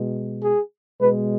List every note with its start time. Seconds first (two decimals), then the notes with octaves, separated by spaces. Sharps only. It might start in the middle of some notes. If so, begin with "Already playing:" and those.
Already playing: B2 G#3
0.43 G#4
1.00 B2 G#3 B4